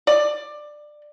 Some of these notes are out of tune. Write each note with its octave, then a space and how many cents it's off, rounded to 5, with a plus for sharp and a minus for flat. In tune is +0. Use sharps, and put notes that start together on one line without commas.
D5 +15